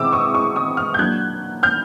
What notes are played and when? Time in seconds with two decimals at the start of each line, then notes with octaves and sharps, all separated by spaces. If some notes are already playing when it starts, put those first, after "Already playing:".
Already playing: B2 G#3 C4 E4 D6 E6
0.13 C#6 D#6
0.34 C#6 D#6
0.56 C#6 D#6
0.77 D#6 F6
0.94 G6
0.99 F#3 A#3 D4 F#6 G#6
1.63 F6 G6